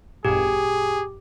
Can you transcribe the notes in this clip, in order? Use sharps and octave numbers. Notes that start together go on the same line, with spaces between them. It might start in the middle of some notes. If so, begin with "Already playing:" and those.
G#1 F#2 A#2 G4 G#4